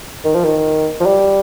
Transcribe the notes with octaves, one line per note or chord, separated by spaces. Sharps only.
D#3
F3
D#3
F3
G3